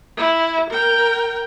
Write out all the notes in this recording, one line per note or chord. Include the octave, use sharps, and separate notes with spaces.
E4
A#4 G5